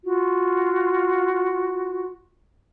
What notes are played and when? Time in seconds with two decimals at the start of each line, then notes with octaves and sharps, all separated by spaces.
0.04 F4 F#4